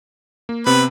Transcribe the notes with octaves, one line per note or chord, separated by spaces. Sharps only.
A#3
C3 B3 C4 B4